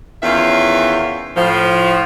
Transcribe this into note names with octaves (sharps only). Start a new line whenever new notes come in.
E2 D#3 C#4 F4 E5
A2 F3